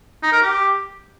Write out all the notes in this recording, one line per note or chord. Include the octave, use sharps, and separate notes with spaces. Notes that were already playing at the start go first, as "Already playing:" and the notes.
D#4
A#4
G4